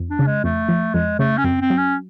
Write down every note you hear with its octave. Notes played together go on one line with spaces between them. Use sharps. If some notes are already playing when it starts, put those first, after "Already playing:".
Already playing: F2
D4
C#3
G#3
F2 A3
F3
F2 G#3
C#3 A3
C#4
F#2 C4
C4
F#3
C#4